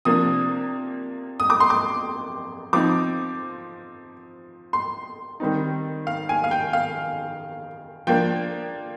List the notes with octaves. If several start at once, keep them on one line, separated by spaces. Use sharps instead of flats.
C3 F3 A#3 D4 D#6
D#6
D6
C6
D6
F3 C4 D#4 D6
C6
D#3 G3 C4 D#4
F5
G#5
F5
G5
F5
F3 A#3 D4 G5